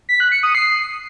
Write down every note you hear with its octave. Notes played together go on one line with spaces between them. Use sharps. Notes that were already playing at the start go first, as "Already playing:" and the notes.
B6
F#6
C#7
D#6
C7